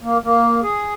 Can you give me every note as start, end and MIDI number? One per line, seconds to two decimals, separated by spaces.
0.02 0.18 58
0.24 0.60 58
0.63 0.94 68